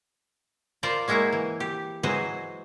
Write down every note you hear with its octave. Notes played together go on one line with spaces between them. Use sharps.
F4 A#4 C5 D5
F#3 G#3 A#3 E4 C5 C#5
E3
G4
E3 F#3 G#3 F#4 C5 D#5